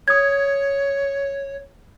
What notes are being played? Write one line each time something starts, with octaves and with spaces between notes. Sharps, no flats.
C#5 D#6 G#6